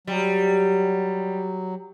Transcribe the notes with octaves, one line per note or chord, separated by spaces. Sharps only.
F#3 G3